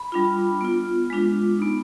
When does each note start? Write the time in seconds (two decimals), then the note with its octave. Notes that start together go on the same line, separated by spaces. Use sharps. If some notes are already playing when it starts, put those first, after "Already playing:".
Already playing: B5
0.12 G3 D4 F4
0.61 B3 F4
1.10 G#3 D4 F4
1.59 B3 D#4